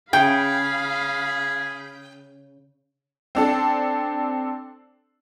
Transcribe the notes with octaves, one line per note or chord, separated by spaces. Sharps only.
C#3 G#4 F5 G5 B5
C4 D4 A4